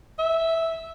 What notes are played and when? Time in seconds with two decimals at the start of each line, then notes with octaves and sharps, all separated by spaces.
0.19 E5